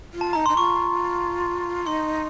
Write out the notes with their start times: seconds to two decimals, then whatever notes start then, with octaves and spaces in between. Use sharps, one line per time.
0.14 F4
0.21 A5
0.33 D#4 A#5
0.46 D#4 C6
0.57 F4 C#6
1.86 D#4 C6